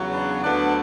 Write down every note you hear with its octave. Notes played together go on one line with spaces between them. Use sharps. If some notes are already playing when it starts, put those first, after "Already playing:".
Already playing: E2 C#3 F#3
B3 D4
D2 D3 F#3 B3 D4